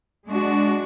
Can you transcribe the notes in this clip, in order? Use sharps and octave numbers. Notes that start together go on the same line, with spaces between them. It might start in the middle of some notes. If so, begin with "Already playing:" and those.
G#3 D4 F#4